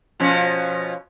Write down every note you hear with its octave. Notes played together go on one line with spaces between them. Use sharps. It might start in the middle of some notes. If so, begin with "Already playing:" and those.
B2 F3 C#4